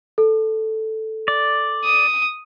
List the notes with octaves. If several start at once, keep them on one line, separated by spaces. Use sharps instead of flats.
A4
D5
D#6